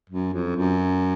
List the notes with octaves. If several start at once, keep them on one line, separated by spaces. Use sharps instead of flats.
F#2
F2
F#2